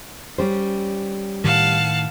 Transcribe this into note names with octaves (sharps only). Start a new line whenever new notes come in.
G3 C#4 C5
A2 D#3 F5 F#5 A5